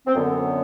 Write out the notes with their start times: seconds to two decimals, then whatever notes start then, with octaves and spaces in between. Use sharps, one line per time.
0.07 C4
0.15 F#2 D3 B3